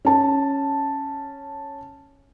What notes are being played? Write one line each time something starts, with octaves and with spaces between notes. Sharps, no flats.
C#4 A5